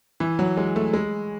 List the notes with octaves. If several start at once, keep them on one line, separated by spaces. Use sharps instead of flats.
E3
F#3
G#3
A3
G#3